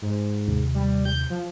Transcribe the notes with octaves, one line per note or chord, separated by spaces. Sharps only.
G#2
D#2 C3
G3
G6
F3